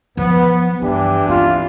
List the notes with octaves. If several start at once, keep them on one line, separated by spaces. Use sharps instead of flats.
F3 F#3 B3
G2 E3 D4 G4
C4 C#4 F4